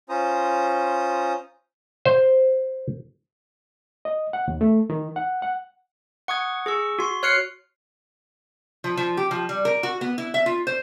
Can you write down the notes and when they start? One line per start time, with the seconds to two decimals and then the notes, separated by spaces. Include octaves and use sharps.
0.09 C#4 F4 C5 A#5 D#6
2.05 C5
4.05 D#5
4.33 F#5
4.48 D#2
4.61 A3
4.90 D#3
5.16 F#5
5.42 F#5
6.28 F#5 C#6 D#6 G#6
6.66 G#4 C#6 E6
6.99 F#4 C6
7.23 C#5 F6 F#6 C7 C#7
8.84 F3
8.97 F3
9.17 G4
9.31 F3
9.49 G3
9.65 A#4
9.83 F#4
10.01 B3
10.18 E4
10.34 E5
10.46 F4
10.67 C5